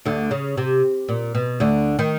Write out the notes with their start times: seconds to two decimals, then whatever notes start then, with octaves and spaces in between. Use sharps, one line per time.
0.05 D2 D3
0.31 C#3
0.57 C3
1.09 A#2
1.35 B2
1.60 D2 D3
1.99 D#3